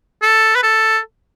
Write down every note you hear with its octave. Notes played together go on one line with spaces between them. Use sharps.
A4
B4
A4